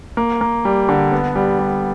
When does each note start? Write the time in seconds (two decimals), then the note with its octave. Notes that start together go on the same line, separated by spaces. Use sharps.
0.17 A#3
0.41 A#3
0.65 G3
0.89 D3
1.12 B3
1.36 G3
1.59 G3